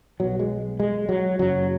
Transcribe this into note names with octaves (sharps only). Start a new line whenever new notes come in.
B1 B2 F#3
G#3
G#3
F#3
F#1 F#2 C#3 F#3